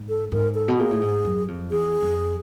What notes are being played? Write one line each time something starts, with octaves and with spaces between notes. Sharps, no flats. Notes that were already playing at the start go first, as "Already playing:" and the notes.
Already playing: G#2
A4
G#2 A#4
A4
B2
A#2 G#4
A2
G#2
F#2
F2
E2 G#4
F2